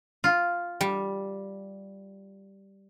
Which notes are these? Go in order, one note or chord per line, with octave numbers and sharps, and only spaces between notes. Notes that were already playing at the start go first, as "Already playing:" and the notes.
F4
G3